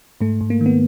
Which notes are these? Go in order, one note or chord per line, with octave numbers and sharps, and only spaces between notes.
G#2 A3
G#2
A#3
D#3
B3